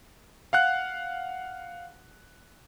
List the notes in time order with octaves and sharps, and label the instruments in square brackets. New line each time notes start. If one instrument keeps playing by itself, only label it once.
[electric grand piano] F5 F#5 F#6